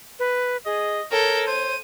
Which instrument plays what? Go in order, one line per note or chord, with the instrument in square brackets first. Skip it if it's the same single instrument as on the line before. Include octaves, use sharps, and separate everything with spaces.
[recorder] B4
[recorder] G#4 [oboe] D#5
[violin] A4 G6 [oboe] A#4 [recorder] C#5
[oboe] C5 [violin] D#7